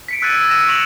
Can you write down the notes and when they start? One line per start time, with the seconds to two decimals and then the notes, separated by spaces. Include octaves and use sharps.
0.08 B6 C#7 D7
0.22 E6 F#6 G#6 A6 D#7
0.37 E6
0.49 F#6 A#6 D#7 E7
0.67 C#6 C#7 F7 F#7